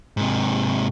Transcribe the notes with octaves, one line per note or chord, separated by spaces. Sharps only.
G#2 C3